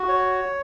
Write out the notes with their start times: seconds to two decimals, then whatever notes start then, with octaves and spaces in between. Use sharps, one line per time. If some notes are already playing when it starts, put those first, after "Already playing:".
Already playing: F#4
0.09 C#5